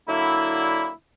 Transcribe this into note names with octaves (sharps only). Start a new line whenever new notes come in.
D3 F#3 A#3 D4 E4